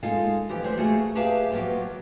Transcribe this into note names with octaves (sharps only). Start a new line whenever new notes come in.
G#3 A#3 D#4 F4 A4 F5
E3 F3 G4
E2 G#3 A3 G4 C5
A3 A#3 F#4 G#4
G4 G#4 B4 E5 F5 A5
F3 F#3 A#3 B3 G4